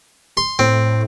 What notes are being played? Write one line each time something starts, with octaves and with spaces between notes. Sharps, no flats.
C6
A2 C4